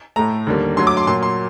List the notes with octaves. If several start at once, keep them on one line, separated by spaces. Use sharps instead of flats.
A2 A3 A#5
D#2 D3 G3 A#3
G2 F#3 A3 C6
D6
C6
A#2 F#3 A#3 C6
C6